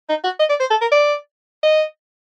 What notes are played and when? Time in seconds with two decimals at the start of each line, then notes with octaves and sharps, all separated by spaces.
0.09 D#4
0.24 F#4
0.40 D#5
0.49 D5
0.60 C5
0.71 A4
0.81 A#4
0.92 D5
1.63 D#5